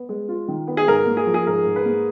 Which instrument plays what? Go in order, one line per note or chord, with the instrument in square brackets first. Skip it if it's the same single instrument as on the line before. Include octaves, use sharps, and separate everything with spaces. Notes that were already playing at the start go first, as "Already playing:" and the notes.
Already playing: [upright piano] B3
G#3
F4
D#3
B3
[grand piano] G#4
[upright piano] G#2 [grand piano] A#4
[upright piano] A#3
[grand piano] G#4
[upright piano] F3
[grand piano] G#4
[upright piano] G#2 [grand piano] A#4
[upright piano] G#2
[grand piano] B4
[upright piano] A#3